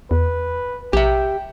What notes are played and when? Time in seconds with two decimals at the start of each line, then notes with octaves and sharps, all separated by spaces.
0.11 E2 B4
0.93 A#1 G4 E5 G5